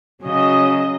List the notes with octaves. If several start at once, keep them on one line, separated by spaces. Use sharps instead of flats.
C#3 F#3 D#5